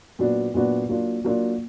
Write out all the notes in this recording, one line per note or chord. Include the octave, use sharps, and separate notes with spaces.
A#2 F#3 B3 D4 F#4
A#2 F#3 B3 D4 F#4
F#3 A#3 D4 F4
F#3 A#3 D4 F4